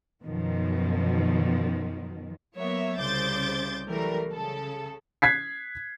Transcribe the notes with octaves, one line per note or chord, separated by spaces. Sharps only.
F#2 B2 D#3 F3
F#3 A#3 B3 C#5 E5
C2 C#3 C5 D6 G6 A6
E3 F#3 G3 A3 A#4
C#3 A4
F#6 G#6 B6 C7